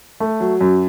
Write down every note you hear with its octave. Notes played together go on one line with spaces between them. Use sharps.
A3
F#3
F#2